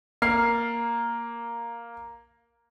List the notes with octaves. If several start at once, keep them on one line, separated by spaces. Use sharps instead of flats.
A#3 F6 C7